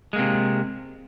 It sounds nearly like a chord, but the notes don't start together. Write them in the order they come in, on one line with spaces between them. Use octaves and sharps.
G#3 A#3 C3